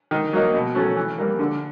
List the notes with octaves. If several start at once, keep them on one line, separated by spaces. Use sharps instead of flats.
D#3
F#3 A#3 D#4
B2
F#3 A3 C#4
E3
G3 A#3
D3